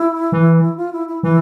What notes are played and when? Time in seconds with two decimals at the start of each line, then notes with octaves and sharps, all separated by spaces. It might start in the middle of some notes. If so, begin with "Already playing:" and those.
Already playing: E4
0.32 E3
0.77 F4
0.93 E4
1.08 E4
1.23 E3 E4